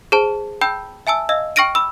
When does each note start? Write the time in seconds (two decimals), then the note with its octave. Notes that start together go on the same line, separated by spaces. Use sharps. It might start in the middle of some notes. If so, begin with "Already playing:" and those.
0.12 G#4 C5 A5
0.61 G5 A5 B5 E6 G6
1.07 E5 G#5 A5 E6
1.29 D#5 F5 E6
1.56 G5 C#6 F6 A#6 D7 D#7
1.75 B5 E6